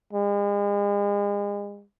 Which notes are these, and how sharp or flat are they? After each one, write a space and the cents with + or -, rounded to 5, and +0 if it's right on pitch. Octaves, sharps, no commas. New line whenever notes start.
G#3 -40